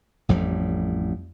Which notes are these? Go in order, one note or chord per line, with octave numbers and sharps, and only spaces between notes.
A1 F2 A2 G3